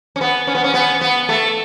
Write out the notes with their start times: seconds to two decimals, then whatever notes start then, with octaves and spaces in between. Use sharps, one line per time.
0.16 C#4
0.21 B3
0.47 C#4
0.55 B3
0.64 C#4
0.74 B3
1.01 B3
1.29 A3